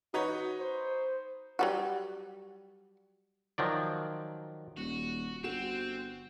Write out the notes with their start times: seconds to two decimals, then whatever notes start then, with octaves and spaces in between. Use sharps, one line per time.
0.14 D#4 F#4 B4 C#5
0.60 C5
1.59 F#3 G3 F#4
3.58 D#3 F3 F#3 D5
4.77 D#1 F#4
5.44 G1 C4 F#4 E7